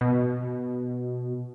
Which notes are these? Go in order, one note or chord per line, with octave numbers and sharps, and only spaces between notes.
B2